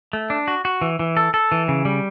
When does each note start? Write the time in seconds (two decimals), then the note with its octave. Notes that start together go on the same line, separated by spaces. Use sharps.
0.13 A3
0.30 D4
0.48 F#4
0.65 F#4
0.81 E3
0.99 E3
1.17 A4
1.34 A4
1.52 E3
1.68 C#3
1.85 G3